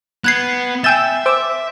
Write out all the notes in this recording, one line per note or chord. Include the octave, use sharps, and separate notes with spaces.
B3 F#6 G#6 C7
E5 G5 G#5 E6 G6 A6 E7
C5 D6 E6